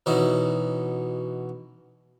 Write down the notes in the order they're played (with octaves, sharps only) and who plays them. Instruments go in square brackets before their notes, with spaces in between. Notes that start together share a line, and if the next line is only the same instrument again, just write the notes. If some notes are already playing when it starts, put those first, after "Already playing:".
[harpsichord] B2 E3 C#4 D#4 F#4